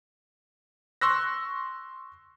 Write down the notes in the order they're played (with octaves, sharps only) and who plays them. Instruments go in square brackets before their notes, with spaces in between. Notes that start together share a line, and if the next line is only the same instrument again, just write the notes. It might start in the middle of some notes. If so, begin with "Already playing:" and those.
[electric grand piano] C6 C#6 E6 F#6 A#6